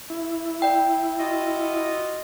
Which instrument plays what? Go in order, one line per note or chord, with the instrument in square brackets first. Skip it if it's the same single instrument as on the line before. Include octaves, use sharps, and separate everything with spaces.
[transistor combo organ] E4
[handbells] D5 G5
[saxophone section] F4 F#4 D#5